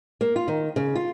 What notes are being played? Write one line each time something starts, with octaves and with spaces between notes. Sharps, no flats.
A#3
F4
D#3
C#3
F4